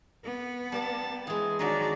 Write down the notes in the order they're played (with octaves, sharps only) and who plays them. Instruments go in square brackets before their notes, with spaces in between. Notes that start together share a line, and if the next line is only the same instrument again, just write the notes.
[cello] B3
[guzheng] G3 D5 A#5 [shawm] A5
[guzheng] E3 G#3 [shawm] G#4
[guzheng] D#3 F#3 G#3 [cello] D4 F#4 [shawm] A#5